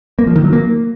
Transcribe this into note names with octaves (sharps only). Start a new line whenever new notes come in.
A#3
F3
D#3
F#3
A#3